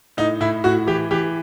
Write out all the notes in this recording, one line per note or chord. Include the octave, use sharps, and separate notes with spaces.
A2 D#4
A2 E4
A2 F#4
E3 G4
E3 G4